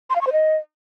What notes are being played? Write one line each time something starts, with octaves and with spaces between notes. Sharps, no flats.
C6
F5
C#6
C5
D#5